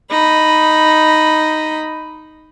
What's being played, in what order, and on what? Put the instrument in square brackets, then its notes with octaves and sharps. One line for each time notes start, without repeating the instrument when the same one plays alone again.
[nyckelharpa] D#4 B5